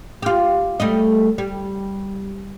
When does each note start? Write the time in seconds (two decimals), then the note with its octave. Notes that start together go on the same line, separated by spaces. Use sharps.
0.22 F4 G4
0.80 G3 A3 D#5
1.38 G3